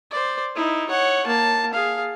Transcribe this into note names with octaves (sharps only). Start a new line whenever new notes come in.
C5 D5
D#4 E4
C#5 F#5
A#3 A5
G#4 F5